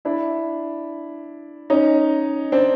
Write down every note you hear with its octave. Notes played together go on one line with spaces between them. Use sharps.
D4 E4
C#4 D#4
C4 D4